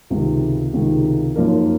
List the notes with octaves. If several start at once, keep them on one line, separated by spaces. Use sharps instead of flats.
C#2 C3 D#3 G#3
C#2 C3 D#3 G#3
F#2 F3 A#3 D#4 A#4